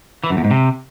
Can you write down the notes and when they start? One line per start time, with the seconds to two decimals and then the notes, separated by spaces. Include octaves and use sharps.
0.24 E3
0.30 F#2
0.37 E2
0.44 G#2
0.51 C3